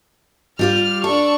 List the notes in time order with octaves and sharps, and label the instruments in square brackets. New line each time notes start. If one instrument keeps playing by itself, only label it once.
[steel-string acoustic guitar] G3 F4 G4 [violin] F6
[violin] D4 C#6 [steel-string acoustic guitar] A4